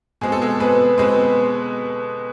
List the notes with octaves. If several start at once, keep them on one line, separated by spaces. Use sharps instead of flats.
B2 G#3 C4 G#4
A4
G#3 G#4
B2 G#3 B3 C4 B4
B2 G#3 B3 C4 B4